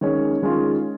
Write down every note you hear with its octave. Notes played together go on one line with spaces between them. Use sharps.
D#3 G#3 C#4 C#5
D#3 G#3 C#4 F4